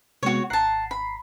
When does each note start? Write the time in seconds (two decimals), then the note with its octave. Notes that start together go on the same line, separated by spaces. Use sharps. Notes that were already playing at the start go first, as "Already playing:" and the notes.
0.23 C3 G#3 B3 F#4 C#5
0.50 G#1 F#5 A5 A#5 C7
0.91 B5